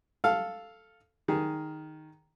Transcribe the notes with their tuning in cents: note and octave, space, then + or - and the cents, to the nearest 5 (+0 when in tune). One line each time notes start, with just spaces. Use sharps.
A4 +0 F5 +0
D#3 +0 G#4 +0